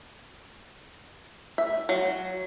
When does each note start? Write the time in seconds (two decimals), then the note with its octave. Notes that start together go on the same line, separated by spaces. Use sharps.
1.58 E5
1.89 F#3